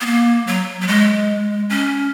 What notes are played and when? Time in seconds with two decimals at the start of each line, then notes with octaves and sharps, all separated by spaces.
0.01 B3
0.06 A#3
0.47 F#3
0.81 F#3
0.87 G#3
1.70 C#4